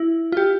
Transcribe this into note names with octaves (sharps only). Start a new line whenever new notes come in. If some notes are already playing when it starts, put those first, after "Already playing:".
Already playing: E4
F4
G4